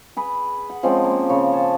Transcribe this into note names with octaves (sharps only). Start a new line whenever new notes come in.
G#4 B4
F#5
F3 G#3 C4 C#4
A#3
C#3 C#5
G#4 A5